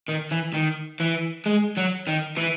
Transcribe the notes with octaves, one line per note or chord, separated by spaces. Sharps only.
D#3
E3
D#3
E3
G#3
F#3
D#3
E3